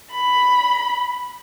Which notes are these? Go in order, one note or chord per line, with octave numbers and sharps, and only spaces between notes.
B5